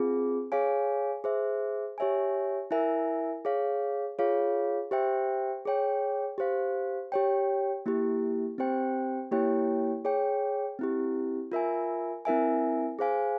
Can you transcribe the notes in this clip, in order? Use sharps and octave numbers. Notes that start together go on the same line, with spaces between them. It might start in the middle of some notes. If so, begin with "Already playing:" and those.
Already playing: C4 F4 G#4
G#4 C#5 F5 G#5
G#4 C5 E5
G4 C#5 E5 G#5
E4 A#4 E5 G#5
G#4 C#5 F5
F4 G#4 C#5 F5
G4 C5 E5 G5
G#4 C#5 G5
G4 C5 F5
G4 C#5 G5
A#3 E4 G4
C4 G4 C5 G5
A#3 E4 G4 C#5 G5
G#4 C#5 G5
C4 E4 G4
F4 A#4 E5 G#5
C4 E4 A#4 E5 G#5
G#4 C5 F5 G#5